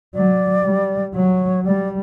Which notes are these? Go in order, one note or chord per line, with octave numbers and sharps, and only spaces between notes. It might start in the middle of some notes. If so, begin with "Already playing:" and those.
F#3 D5
G3
F#3 C#5
G3 D5